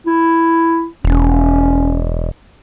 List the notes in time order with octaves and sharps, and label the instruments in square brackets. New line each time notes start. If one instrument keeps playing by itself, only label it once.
[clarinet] E4
[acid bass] E1 [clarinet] C#4